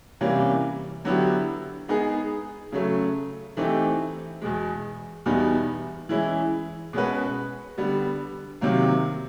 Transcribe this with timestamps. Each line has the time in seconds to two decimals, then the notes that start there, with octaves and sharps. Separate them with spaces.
0.21 C3 E3 G3 A#3 C#4
1.05 D3 F#3 B3 E4 G4
1.88 G#3 B3 D#4 G#4
2.72 C#3 F#3 A3
3.57 E3 A3 C4 D#4 G4
4.42 E2 B2 G#3
5.26 E2 B2 G3 B3 D#4
6.09 E3 G#3 C#4 E4
6.93 B2 G#3 C#4 F#4 B4
7.78 D3 G3 B3
8.61 C3 D#3 F#3 A#3